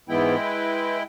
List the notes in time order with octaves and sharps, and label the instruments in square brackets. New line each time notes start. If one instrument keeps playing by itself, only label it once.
[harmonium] G#2 E3 B3 [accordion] G#3 E4 G5
[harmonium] B4